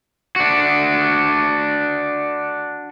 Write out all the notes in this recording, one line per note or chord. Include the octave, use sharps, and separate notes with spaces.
D4 F#4